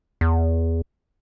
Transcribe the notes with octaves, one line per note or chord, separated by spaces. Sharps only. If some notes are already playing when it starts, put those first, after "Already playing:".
E2